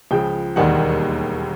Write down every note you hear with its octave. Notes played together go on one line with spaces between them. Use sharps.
C#2 C#3 F3 G5
E1 D#2 D#3 G3 F#5